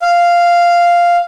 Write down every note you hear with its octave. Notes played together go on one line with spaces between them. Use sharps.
F5